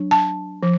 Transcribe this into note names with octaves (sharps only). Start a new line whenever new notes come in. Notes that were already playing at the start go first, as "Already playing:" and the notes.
Already playing: F#3 D4
A5
F3